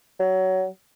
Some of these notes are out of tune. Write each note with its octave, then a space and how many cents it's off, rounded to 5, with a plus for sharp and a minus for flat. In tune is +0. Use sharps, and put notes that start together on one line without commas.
F#3 +20